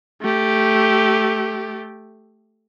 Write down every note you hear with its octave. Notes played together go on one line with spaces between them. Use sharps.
A3 G4